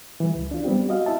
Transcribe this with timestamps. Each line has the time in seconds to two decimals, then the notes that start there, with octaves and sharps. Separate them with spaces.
0.20 E3 G3
0.35 C#2
0.51 D4 F4
0.64 G3 B3 C4 G4
0.89 F#4 D#5 F5
1.06 E4 E5 A5